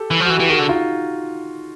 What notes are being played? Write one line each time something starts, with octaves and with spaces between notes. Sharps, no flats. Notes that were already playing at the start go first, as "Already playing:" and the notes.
Already playing: G4 A4
E3
F3
E3 F#4
E3 G4
D#3 F#4 G#4
D3
D#4 F4